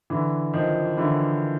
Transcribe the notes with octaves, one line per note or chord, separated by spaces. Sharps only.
D3 E3
D#3 F3
D3 E3